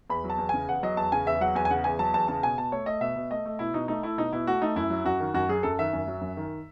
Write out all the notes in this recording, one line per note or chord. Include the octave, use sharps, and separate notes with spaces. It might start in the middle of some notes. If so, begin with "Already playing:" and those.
E2 B5
F#3
A5
E2
C#3 G#5
E2 F#5
F#3 D#5
E2 A5
C#3 G#5
E2 E5
F#3 F#5
E2 G#5
G#5
C#3 F#5
E2 G#5
F#3 A5
E2 A5
C#3 A5
B2 G#5
B2 A5
A3 C#5
A3 D#5
B2 E5
B2
A3 D#5
A3
B2 E4
B2 D#4
A3 D#4
A3 E4
B2 D#4
B2 E4
A3 F#4
A3 D#4
F#2 E4
F#3
F#2 F#4
D#3
F#2 F#4
F#3 G#4
F#2 A4
D#3 E5
F#2
F#3
F#2
D#3